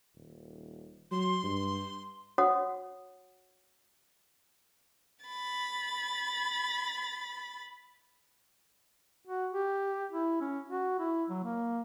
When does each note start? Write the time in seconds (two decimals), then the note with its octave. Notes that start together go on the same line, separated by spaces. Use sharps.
0.15 D#1
1.11 F#3 C6
1.43 G2
2.38 F#4 C#5 F#5 D#6
5.25 B5 A6
9.27 F#4
9.52 G4
10.12 E4
10.41 C#4
10.68 F#4
10.99 E4
11.30 F#3
11.44 A#3